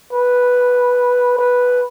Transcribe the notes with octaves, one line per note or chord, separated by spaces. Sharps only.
B4
B4